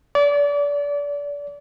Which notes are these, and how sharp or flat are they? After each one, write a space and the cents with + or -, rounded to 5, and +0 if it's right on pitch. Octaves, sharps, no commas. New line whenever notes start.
D5 -30